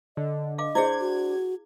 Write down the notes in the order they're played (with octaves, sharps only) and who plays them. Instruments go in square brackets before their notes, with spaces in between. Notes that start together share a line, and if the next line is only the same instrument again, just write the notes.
[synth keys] D3 [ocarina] D#5
[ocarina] D#5 [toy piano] F5 D6
[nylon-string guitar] D4 C5 D5 [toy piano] E4 G#4 [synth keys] G#6
[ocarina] F#4